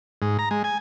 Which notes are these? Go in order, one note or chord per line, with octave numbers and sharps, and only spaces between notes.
G#2
A#5
G#3
G#5